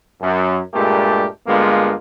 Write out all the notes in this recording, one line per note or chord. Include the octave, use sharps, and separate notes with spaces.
F#2
G2 A#2 G#3 A3 G4 A#4
G2 D3 G#3 A#3 B3 F4